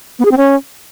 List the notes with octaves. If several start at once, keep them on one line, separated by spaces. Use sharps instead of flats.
B3
G#4
C4
C#4